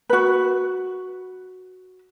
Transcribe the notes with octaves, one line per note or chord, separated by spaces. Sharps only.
F#4 B4